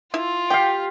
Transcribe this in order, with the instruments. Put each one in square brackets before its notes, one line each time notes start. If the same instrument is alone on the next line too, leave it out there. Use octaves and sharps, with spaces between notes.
[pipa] E4 [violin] F4
[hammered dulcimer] G4 F5 [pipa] G5